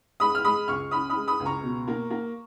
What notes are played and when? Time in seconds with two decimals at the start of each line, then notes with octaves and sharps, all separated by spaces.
0.20 G#3 B5 D#6
0.35 F6
0.44 G#3 B5 D#6
0.68 C#2 C#6 F6
0.91 C#4 B5 D#6
1.10 B5 D#6
1.16 G#3
1.27 B5 D#6
1.40 C#2
1.46 A#5 C#6
1.63 B2
1.88 A#3
2.10 A#3